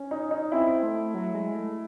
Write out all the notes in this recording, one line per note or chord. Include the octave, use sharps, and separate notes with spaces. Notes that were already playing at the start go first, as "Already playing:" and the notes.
Already playing: C#4
D#4
D#4
C4 E4
A3
F#3
G#3
A3